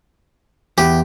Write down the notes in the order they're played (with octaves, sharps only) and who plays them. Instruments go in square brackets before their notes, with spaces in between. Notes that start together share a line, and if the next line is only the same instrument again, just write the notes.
[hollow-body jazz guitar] E2 [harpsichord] G4